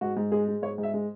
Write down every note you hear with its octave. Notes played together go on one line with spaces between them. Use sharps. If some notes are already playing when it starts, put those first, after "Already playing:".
G#2 F#4
G#2
G#3 G#4
G#3
G#2 C#5
G#2
E5
G#3